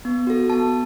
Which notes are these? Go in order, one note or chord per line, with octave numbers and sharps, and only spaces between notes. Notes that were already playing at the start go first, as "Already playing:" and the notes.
B3
F#4 A4
B3 A5